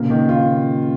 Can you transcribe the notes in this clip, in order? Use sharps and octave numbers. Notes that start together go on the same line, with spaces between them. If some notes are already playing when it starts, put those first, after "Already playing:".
Already playing: A#2 C#3 A#3
D#3
F4